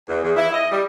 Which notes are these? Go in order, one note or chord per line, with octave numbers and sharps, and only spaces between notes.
E2
E2
E4
D#5
G3